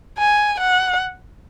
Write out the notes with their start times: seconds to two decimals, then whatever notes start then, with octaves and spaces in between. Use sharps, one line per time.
0.18 G#5
0.60 F#5